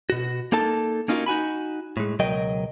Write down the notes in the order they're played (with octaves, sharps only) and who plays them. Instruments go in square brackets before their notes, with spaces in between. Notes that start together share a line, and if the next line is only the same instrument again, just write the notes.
[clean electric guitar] B2 F#4
A#3 D#4 A4 A5
A#3 C#4 D#4 F4 F#4 A#4
D#4 F#4 G#5 B5
A2 G#3
C#2 B2 F#3 A#4 D#5 G5